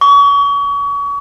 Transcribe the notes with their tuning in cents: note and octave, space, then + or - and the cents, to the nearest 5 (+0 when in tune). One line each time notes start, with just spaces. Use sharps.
C#6 +35